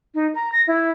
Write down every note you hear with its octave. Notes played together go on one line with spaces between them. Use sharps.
D#4
A#5
A#6
E4